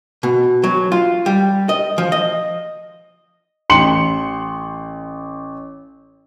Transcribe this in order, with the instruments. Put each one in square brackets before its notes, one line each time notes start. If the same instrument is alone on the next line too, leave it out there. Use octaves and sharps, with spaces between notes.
[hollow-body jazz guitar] B2
F#3
F4
G3
D#5
F3
D#5
[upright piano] A1 C6 C#7 F#7